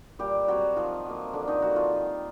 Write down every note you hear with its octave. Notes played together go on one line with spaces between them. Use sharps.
A#2 G3 G4
F#3 G3 C4 F#4
D#3 F3 F4
F#3 A#3
D3 D4
D#3 D#4
F#3 G3 A#3 F#4
F3 F4
D#3